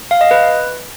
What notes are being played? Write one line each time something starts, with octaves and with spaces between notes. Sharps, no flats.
F5
D#5
B4